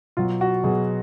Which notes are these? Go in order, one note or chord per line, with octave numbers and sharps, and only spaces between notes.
B2 F#3 F4
F#4
B2 F#3 G#4